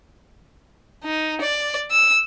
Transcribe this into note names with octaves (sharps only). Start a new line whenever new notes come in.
D#4
D5
E6